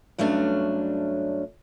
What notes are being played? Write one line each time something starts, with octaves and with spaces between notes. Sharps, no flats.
G2 F#3 A3 C#4 D4